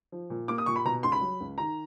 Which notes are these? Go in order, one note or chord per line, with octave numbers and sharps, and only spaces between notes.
F3
A#2
A#3 D6
D#6
A#2 C#6
B5
B2 A#5
C#2 C6
B5
F#3
C#2
D#3 A#5